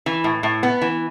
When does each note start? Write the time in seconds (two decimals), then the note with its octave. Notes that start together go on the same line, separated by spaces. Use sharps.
0.06 E3
0.24 A2
0.43 A2
0.63 B3
0.81 E3